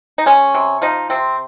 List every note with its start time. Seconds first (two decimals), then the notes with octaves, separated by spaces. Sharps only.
0.18 D#4
0.26 G#3 C#4
0.55 C3
0.82 F3 D#4
1.10 C3 C4